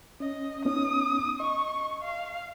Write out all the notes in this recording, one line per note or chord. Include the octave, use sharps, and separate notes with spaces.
C#4 D#5
B3 C#4 D#4 D#6
D#5 C#6
F5